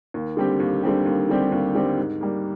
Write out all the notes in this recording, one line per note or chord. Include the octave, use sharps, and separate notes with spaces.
D#2
D3 G3 C4 G4
D#2
D3 G3 C4 G4
D#2
D3 G3 C4 G4
D#2
D3 G3 C4 G4
G#2
G3 A#3